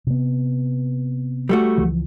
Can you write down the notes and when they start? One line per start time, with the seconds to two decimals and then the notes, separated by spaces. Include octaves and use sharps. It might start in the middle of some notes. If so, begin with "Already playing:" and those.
0.07 C3 B3
1.49 G3 A3 F#4
1.78 C#2 E3 F3